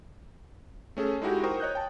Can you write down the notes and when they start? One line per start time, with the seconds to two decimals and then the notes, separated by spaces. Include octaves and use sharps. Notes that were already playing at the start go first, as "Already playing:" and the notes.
0.97 A3 C#4 G#4 A4
1.22 G#3 D#4 E4 F#4 G4
1.44 A#4 C5 G5 A#5 C#6 D#6
1.60 C#5 D#5 F#6 G6
1.75 G5 A5